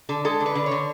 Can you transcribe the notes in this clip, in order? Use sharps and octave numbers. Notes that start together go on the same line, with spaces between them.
D3 A4
G#3 A4
D3
B4
D3
C#5
D3